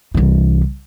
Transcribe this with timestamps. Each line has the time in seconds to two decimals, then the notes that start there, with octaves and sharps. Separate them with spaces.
0.14 C2 E3